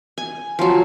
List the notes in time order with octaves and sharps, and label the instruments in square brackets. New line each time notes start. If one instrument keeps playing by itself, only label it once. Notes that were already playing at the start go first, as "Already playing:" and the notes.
[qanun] G#5
F3 F#3